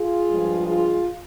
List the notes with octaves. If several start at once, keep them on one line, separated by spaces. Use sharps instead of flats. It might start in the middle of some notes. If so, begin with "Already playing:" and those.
Already playing: F4 G#4
G2 F3 G#3
F4 G#4